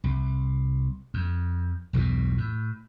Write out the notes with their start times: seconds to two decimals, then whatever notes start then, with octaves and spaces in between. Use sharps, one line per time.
0.04 C2
1.14 F2
1.93 B1 E2 G2 B2
2.38 A2